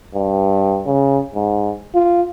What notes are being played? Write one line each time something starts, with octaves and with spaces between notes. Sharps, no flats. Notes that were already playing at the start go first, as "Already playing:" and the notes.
G2
C#3
G#2
F4